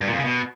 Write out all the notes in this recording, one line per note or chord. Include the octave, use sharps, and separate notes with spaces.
G2
A#2
F2
C#3
B2